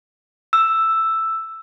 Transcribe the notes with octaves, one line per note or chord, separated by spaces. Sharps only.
E6